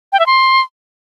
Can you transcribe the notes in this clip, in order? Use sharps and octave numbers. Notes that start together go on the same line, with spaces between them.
G5
E5
C6